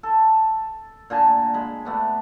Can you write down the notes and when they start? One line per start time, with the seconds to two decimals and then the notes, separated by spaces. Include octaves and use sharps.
0.03 A4
1.10 A#2 D3 G#5 A5
1.54 G#3 B5
1.85 A3 B3 D4